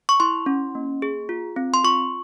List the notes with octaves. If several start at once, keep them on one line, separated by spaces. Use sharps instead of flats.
C#6
E4 C6
C#4
A#3
G#4
F4
C4
C6
F4 C#6